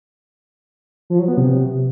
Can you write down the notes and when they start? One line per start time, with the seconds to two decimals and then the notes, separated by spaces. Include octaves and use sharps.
1.10 F3
1.19 F#3
1.28 B3
1.37 C3